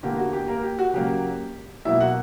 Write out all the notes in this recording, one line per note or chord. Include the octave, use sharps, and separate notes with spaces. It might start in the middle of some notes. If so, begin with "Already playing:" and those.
E2 D3 A#3 G4
F#4
G4
A#3 A#4
G4
F#4
C#3 F#3 A#3 G4
B2 F#3 A#3 E4 E5
F#4 F#5